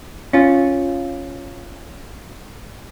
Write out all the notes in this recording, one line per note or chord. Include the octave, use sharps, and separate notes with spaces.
C#4 F4